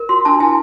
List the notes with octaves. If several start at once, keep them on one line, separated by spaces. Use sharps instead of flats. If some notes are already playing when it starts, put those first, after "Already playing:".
Already playing: A#4
F#4 C6
D4 A5
E4 G#5